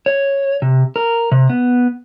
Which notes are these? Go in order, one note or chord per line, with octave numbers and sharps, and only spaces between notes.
C#5
C3
A#4
C3
B3